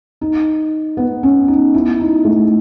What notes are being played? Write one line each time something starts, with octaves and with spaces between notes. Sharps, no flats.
D#4
B3
C#4
D#4
E4
D#4
A3